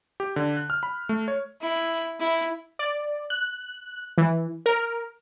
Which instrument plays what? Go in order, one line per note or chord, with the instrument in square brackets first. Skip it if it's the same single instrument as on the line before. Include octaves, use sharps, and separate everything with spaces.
[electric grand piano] G4
D3
F#6
F6
B5
A3
C#5
[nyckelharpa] E4
E4
[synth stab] D5
F#6
E3
A#4